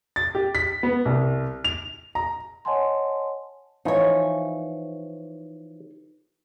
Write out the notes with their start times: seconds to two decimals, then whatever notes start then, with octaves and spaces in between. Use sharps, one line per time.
0.16 A6
0.35 G4
0.55 B6
0.83 B3
1.05 C2
1.64 F7
2.15 A#5
2.65 C#5 D#5 F#5 G#5 A5 C6
3.85 E3 F3 D#4 C#5